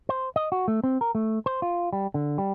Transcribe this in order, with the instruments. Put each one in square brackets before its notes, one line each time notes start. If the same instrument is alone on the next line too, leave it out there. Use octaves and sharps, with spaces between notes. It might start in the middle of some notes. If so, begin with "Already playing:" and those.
[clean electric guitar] C5
D#5
F#4
A3
C4
A#4
A3
C5
F4
G3
D3
G3